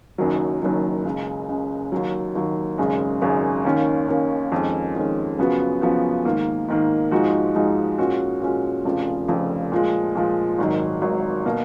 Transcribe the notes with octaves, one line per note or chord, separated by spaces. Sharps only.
F#1 F#2 D#3 F#3
F#1 F#2 D#3 F#3
C#2 C#3 G#3
C#2 C#3 G#3
D#2 D#3 F#3
D#2 D#3 F#3
G#1 F#2 C#3 G#3
G#1 F#2 C#3 G#3
D#2 D#3 A#3 C#4
D#2 D#3 A#3 C#4
F2 D#3 G#3 C#4
F2 D#3 G#3 C#4
F#2 C#3 F3 B3 F#4
F#2 C#3 F3 B3 F#4
G#2 D#3 A#3
G#2 D#3 A#3
G#2 F3 G#3 D#4 F#4
G#2 F3 G#3 D#4 F#4
A#2 G#3 C#4 F#4
A#2 G#3 C#4 F#4
F1 F2 C#3 F3
F1 F2 C#3 F3
A#2 F3 G#3
A#2 F3 G#3
G#1 G#2 D#3 F#3
G#1 G#2 D#3 F#3
B2 A#3